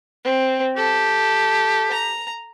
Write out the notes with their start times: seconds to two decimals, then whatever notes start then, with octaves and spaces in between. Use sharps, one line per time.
0.24 C4
0.77 G4 A4
1.91 A#5